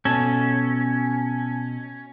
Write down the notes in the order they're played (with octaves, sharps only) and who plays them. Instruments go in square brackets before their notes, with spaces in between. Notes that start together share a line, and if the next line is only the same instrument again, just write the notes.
[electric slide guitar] B2 A4 [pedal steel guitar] C#4